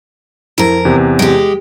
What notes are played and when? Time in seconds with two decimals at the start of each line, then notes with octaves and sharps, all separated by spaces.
0.58 F2 E4 A#4
0.85 E2 C3
1.19 G#3 G4